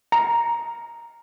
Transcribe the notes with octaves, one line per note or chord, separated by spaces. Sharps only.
A#5